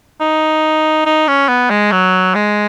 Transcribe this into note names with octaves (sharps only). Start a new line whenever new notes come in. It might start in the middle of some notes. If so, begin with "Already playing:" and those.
D#4
D#4
C#4
B3
G#3
F#3
G#3